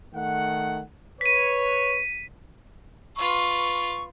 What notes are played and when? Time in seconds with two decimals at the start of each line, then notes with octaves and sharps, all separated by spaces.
0.15 D#3 A3 F#5
1.21 B4 C#5 B6 D#7
3.16 F4 B4 C#6